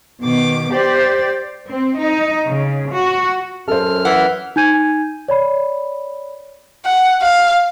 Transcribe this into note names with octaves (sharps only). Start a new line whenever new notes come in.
B2 D#3 D6
G4 C5 D5
C4
D#4
C#3
F#4
F#2 A4 C5 F6
E3 F#5
D#4 G#5 G6 G#6 D#7
C#5 D5 B5
F#5
F5